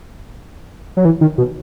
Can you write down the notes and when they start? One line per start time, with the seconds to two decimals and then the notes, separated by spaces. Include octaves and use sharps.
0.97 F#3
1.05 E3
1.21 D#3
1.38 B2